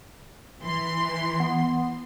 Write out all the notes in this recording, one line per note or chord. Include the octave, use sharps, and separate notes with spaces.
E3 C6
B3